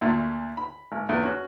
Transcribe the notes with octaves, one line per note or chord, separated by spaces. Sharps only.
D2 A#2 A3
B5
G#1
E2 A#2 A3
C#4 F#4